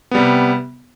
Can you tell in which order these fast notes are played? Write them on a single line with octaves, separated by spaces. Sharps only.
B3 G3 C3